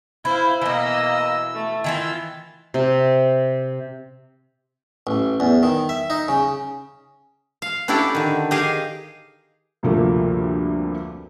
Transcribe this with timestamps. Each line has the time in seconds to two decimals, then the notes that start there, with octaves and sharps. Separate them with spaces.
0.25 E4 C5 F5
0.61 B2 E3 A#3 D#5 E6
1.54 A3
1.84 D#3 E3 F4 E6
2.74 C3
5.07 A1
5.40 E2
5.63 D#3
5.89 E5
6.10 D#4
6.28 C#3
7.62 F5
7.88 C#4 D4 E4 G4 A4 D5
8.15 D3 D#3
8.51 G4 G#4 D#5 F5
9.83 D2 G2 C3 F3 A3 A#3